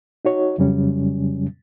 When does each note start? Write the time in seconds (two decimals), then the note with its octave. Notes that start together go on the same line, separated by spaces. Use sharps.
0.25 D#4 F#4 C#5
0.58 F2 C#3 F#3 G3 C#4